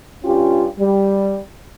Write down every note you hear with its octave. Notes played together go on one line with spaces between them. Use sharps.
G2 C#4 F4 G4
G3